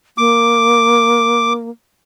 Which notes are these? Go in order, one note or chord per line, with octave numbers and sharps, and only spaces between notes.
A#3 D6